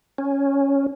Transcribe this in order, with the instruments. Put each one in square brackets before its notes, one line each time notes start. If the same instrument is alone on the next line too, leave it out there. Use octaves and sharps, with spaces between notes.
[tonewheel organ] C#4